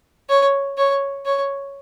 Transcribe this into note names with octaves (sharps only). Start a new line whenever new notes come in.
C#5
C#5
C#5